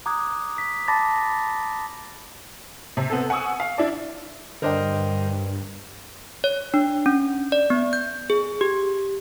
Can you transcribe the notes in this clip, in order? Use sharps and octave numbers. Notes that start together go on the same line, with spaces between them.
A#5 D6 D#6 F#6 G#6
B6
A5 B5 D6 A6 A#6
C3
B3 C4 A4
F#5 G#5 C#6 D#6 E6
F5
D4 E4 D5
G2 D3 D4 A#4 C5 D#5 G5
C#5
D4
C#4
D5
B3
G6
G#4
G4